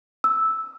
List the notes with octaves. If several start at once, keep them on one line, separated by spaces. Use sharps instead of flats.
E6